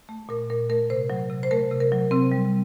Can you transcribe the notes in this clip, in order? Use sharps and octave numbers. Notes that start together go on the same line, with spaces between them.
A3
A#2 A#4
A#2 A#4
A3 A#4
C3 C5
F#3
C3
C5
A3 A#4
C3
A#4
F#3
C3 C4
G3